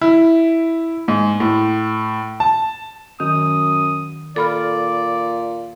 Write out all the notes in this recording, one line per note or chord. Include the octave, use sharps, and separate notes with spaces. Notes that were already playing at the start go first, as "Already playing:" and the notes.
E4
G#2
A2
A5
F#2 D#3 D#6
A#2 A4 D5 B5 F6